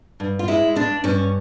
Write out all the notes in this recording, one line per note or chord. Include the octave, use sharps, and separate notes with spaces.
G2
F4
G#3 E4
G2 D4
G2 C#4